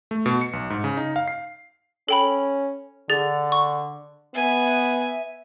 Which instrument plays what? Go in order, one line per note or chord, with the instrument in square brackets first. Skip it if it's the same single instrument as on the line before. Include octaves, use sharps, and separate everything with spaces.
[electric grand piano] A3
B2
C#7
B1
G#2
C#3
D#4
F5
C7
[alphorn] C#4 [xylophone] A4 G5 B5
[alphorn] D3 [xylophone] G#4 A6
[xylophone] C#6
[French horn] B3 [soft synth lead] E5 [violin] G#5